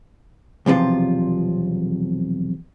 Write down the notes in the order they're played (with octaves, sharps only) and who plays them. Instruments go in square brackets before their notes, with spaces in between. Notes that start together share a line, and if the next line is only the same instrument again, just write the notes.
[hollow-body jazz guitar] B1 E2 C3 F3 F4